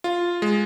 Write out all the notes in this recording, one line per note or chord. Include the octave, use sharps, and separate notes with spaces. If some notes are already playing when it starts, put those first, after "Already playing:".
F4
G#3